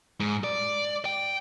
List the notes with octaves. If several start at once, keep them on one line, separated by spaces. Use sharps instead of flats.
G#2
D5
G5